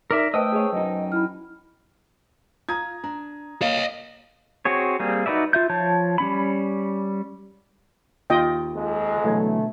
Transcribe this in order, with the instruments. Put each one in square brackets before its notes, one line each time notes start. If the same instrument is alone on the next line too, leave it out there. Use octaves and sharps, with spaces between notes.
[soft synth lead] D#4 [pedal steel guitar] A#4 D5 E5
[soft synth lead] A3 [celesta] B4 C5 A5 [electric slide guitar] D#5 [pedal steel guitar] G5 D#6 E6
[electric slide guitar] G#4 C#5
[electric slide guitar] F#2 D#4 [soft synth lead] D#5
[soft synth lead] E4 [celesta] B5 F6
[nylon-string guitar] F4 [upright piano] A#5 D#6 G#6
[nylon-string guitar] D4 [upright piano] A#5
[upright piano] A#3 [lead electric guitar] C#5 D#5 [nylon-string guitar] F5
[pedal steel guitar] C4 F#4 G#4 C#5
G3 A#3 C4 G#4
D#4 F#4 B4 D5 E5
F4 E5 G6
F3 C#5 A5 G6
G3 C#4 B5
[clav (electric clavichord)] D#2 [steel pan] F4 D#5 G5
[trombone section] F2 G#3
[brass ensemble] B2 D3 A3 [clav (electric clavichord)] E3 F#3 G#5